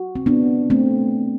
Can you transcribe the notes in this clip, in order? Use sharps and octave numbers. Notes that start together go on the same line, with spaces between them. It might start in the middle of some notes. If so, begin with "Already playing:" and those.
Already playing: F#4
C4
B3 D4
A3 C4